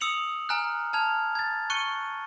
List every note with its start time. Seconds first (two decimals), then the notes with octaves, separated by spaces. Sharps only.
0.01 D#6 E6 C#7 F7 F#7
0.49 G#5 A#5 F6 F#6
0.93 A5 F6 G#6 F7
1.35 G#6 A6
1.70 C#6 F#6 C#7 D#7 G7